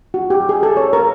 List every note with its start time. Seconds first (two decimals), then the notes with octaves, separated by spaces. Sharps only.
0.14 F#4
0.30 G4
0.49 G#4
0.63 A4
0.77 C#5
0.93 A#4